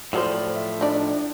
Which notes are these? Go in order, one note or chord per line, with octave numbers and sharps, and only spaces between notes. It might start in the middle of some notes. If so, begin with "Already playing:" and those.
A2 F3 F#3 A#4 C5 D5
E5
D4 D#4 D5